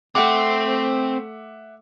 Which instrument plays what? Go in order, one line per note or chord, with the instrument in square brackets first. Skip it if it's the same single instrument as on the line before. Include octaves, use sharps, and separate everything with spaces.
[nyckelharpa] A3 [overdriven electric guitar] C4 [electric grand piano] E5 F#5 D6